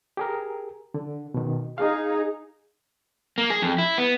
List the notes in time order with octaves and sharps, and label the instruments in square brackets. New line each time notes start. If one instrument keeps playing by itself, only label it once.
[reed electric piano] G4 G#4 A#4
D3
B2 D#3
[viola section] D#4 G#4 [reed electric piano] F5
[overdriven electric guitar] A#3
G#4
F2
E4
B3